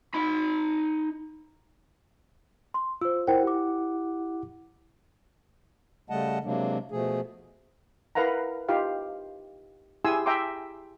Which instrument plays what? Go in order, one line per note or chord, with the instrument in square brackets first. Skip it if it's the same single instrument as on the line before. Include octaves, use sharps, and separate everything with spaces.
[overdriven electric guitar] D#4 B5
[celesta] C6
[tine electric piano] F4 [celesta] C5 E6
[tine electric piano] E4 F#5 [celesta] A#4 C5 G5
[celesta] G4 D6
[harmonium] C#3 G3 A3 D#5 F#5 A5
C3 F#3 G#3 A#3 D4
B2 F3 A3 G#4
[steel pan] E4 A#4 B4 F5 F#5 A#5
D#4 F4 G4 F5
E4 G4 G#4 G#5 C6 E6
E5 G5 A#5 C6 D6